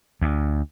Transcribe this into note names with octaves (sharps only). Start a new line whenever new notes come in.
D2